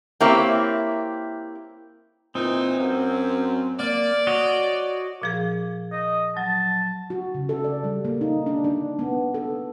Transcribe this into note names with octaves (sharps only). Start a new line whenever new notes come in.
A#3 C4 E4 G4 C#5
A#2 E3 C4 D#4
F#2
A#3 D5
F#4 C#5 D#5
A#2 F3 G#4
D#5
F#3 A5
F#4
C#3
A4
D5
G3
A#3
D#4
D4
D4
B3
A4